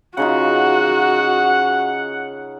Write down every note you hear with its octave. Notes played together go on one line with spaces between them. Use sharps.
C#3 D#4 F4 F#4 F#5